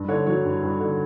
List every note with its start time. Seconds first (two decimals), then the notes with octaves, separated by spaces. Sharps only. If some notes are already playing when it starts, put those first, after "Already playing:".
Already playing: G2
0.08 D3 C#5
0.27 F#3 C#5
0.45 G2
0.63 G2
0.80 D3